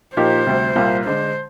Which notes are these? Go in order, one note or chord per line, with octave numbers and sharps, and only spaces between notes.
A#2 F3 A#3 D#4 G4 C5
D2 C3 G3
C2 A#2 G3 A#3 F4
D3 G#3 D4 C5